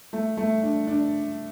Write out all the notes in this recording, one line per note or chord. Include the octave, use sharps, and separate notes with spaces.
A3
A3
D4
D4